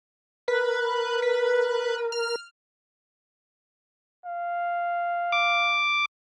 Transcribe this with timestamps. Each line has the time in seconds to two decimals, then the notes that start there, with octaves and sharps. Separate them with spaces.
0.48 A#4 B4
1.22 B4
2.12 F6
4.25 F5
5.32 D6